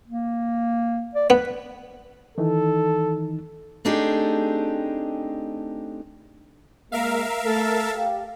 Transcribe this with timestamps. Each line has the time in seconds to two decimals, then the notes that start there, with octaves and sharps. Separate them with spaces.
0.07 A#3
1.15 D5
1.30 B3 B4
2.38 D#3 E3 D#4 A4
3.85 A3 C4 D4 D#4 G4 G#4
6.92 G#3 A#3 A#4 E5 F5
7.44 A3 A4
7.94 G4 F5